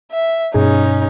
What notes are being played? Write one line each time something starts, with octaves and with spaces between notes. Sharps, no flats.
E5
G2 B2 C#4 D#4 G#4